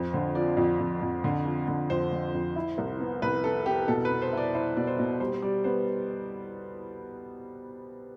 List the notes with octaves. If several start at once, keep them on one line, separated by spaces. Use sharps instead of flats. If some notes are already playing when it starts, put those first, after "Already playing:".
Already playing: F2 C5
D3 C5
F3 D5
F2
F2
F2
D3
F3
D3
F2 C5
D3
F2
E4
C2
B3
C2 B4
B3 A4
B3 G4
B2 A4
B4
B3
C5
E4 D5
E4 C5
B2 D5
C5
B2
G3 C5
C5
G3 D5
B3 C5